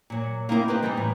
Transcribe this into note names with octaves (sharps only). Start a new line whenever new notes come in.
A#2 F#3
A#3 C4 D#4 E4 G4 A#4
C4 G4 B4 D#5
E3 G3 C4 C#4 D#4
A2